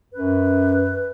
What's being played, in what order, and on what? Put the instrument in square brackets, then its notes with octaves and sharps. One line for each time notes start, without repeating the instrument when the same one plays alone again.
[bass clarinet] F#2 [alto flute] B4